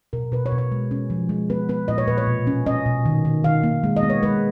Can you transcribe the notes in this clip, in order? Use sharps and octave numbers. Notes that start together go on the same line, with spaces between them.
B2 A#4
B2 B4
C#5
B2
C#5
G#3
C#4
F3
G#3
B3 B4
B3 B4
A#2 D#5
C#5
A#2 B4
C#5
B2
C#4
C#4 D#5
B2
D#3
D#3
D#3 F5
A#3
G#3
D#5
B3
C#5
G#3 B4